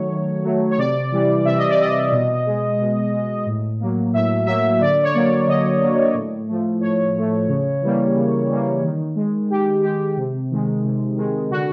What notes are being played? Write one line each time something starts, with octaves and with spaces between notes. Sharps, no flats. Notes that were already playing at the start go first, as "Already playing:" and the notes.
Already playing: D#3 F#3 A3 C#5
D#3
F#3 A3
C#5
C3 D5
E3 G3
C3 E5
D#5
D5
E3 G3 D#5
B2
G#3
B2
G#3
A2
F#3 A#3
A2 E5
F#3 A#3 E5
D3 D5
C#5
F#3 A#3 D5
D3 D#5
F#3 A#3
A2
F3 A3
A2 C#5
F3 A3
C#3
E3 G3 A#3
C#3
E3 G3 A#3
D#3
G#3
D#3 G4
G#3 G4
C3
D#3 G#3
C3
D#3 G#3
D3 F#4